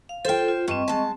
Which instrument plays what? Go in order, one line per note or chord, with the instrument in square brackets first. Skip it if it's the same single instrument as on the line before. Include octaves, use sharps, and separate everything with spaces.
[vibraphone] F5
[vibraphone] F4 A4 [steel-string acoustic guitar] C5 G5
[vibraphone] F4
[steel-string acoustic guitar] G2 [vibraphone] C4 D#5 C#6
[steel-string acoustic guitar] G#3 A5